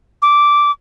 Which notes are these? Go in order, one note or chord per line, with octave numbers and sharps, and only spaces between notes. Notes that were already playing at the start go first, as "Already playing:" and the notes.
D6